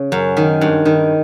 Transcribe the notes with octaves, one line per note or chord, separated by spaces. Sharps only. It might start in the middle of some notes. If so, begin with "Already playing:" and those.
Already playing: C#3
F#2
D#3
G2
D#3